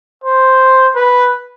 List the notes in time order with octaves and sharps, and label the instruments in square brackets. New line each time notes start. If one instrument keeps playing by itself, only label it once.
[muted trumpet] C5
B4